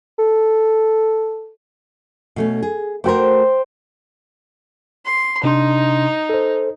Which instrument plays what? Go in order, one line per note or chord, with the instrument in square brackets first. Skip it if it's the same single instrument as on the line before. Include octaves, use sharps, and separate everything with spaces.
[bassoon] A4
[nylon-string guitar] B2 A3 C#4
G#4
[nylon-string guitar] A3 F#4 A#4 [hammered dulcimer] C5 G5 D6
[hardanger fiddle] C6
[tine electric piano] C3 D4 C6 [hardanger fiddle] D#4
[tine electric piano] A4 C5